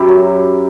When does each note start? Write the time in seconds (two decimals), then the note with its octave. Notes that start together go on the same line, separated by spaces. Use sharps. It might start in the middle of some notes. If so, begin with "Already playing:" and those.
Already playing: F#2 E4 G4 A#4
0.09 F#3